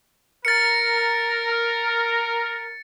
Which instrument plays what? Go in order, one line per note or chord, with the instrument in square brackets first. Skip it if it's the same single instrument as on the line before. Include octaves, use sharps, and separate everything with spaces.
[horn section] A#4 [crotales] A6 C#7